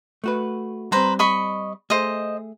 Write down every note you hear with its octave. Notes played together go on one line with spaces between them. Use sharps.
A3 F#4 B4
G3 C4 B4 C5 A#5
D#5 B5 C#6
A3 G#4 C5 D#5